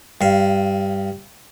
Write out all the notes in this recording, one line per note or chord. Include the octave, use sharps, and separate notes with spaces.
G2 F5